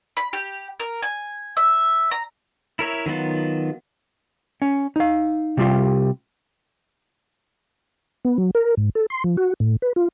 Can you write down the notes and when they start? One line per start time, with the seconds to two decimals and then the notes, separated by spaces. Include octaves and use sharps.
0.17 B5
0.33 G4
0.80 A#4
1.02 G#5
1.57 E5
2.11 A#5
2.79 E4 A#4 C#5 E5
3.06 D#3 F#3 B3 F4
4.62 C#4
4.96 D#4 F5
5.57 C3 G3 F4 G4
8.25 B3
8.38 F#3
8.55 A#4
8.77 G#2
8.95 A4
9.10 C6
9.24 F3
9.37 F#4
9.60 A2
9.82 B4
9.96 F4